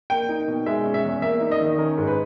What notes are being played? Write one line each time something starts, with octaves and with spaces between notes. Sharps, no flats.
A#3 G5
D#4
B2
G#3 E5
C#4
E5
E2
A#3 E5
D#4
D#5
D#3
C#4 A#4
G#2
B4